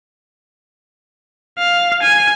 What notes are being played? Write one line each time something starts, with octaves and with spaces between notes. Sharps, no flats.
F5
G#5